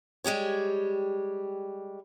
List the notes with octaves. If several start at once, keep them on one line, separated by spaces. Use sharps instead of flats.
G3 G#3 G4 C#5